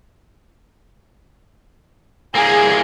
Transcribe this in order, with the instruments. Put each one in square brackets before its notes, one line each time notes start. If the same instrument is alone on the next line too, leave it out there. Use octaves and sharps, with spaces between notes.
[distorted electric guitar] C2 A#3 [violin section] G#4